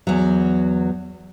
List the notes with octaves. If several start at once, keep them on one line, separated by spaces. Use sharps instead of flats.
E2 F#3